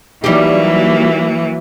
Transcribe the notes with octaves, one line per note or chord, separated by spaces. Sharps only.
E3 F#3 G3 A#3 D#4 G4